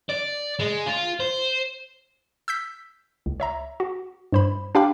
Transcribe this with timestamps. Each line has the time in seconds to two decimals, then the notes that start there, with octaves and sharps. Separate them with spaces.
0.09 D5
0.59 G#3
0.86 F4
1.20 C5
2.48 E6 G6 B6
3.26 C#2
3.40 C#5 E5 A#5
3.80 F#4
4.33 G2 C5 B5
4.75 D4 G4 F5 G5 B5 D6